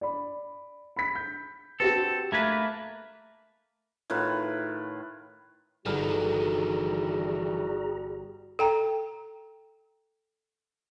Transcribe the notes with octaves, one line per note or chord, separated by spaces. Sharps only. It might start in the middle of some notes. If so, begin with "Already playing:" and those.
D5 B5
B5 B6
G6
C4 F#4 G4 A4 B4
A3 A#3 B4 G#6
A2 D#3 F4 B4
G1 D#3 E3 G3 F#4 G#4 A#5 F6
A4 G5 A#5